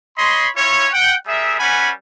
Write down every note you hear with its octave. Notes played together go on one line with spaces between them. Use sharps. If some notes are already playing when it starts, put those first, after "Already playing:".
C#5 D#5 B5 C6
C#4 E4 F4 C#5
F#5 G5
G3 G#4 A#4 E5
G3 C#4 B4 F#5 G#5 B5